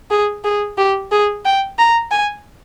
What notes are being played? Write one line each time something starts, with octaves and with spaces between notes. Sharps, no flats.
G#4
G#4
G4
G#4
G5
A#5
G#5